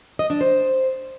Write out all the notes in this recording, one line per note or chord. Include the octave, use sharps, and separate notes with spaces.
D#5
D4
C5